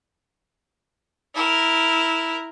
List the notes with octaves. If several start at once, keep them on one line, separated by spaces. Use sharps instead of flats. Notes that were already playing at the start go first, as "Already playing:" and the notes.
E4 A#4